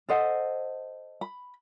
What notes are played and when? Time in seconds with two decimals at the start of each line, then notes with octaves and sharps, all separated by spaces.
0.09 A4 C5 D#5 F#5
1.21 B5